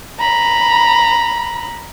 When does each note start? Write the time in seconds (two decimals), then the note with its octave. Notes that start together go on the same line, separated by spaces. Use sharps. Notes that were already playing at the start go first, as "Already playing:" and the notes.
0.20 A#5 B5